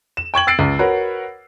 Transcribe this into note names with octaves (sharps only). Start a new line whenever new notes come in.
E7
G5 C#6 G#6 F#7
E6 A6 C7 D7
C#2
F#4 A#4 B4 C#5 F#5